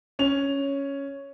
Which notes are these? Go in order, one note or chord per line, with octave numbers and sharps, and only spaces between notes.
C#4 F7